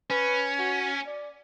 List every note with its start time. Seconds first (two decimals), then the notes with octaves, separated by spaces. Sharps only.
0.10 C#4 B4
0.58 F#4
1.06 D5